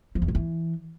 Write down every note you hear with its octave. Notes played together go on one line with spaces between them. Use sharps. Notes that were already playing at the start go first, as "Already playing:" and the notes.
F3
E2
A2
E3